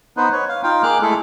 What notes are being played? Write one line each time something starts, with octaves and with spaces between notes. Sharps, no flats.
B3 D#4 B4 C5
B4 C#5
F5
D#4 F4 F5 G5
A#3 G#4 D6 F6 F#6
G#3 A3 E4 G#4 A4